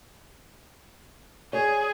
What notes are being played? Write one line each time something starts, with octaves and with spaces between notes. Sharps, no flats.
G#4 C#5